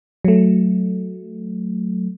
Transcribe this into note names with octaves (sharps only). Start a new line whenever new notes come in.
F#3 A3